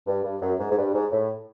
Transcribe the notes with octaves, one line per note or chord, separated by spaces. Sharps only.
G2
G2
F#2
G#2
G#2
G2
G#2
A2